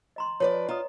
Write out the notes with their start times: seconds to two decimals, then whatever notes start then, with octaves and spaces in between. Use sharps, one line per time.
0.16 D#5 A#5 C6
0.40 F3 B4 C#5 D5
0.69 F4 D#5 A#5 D#6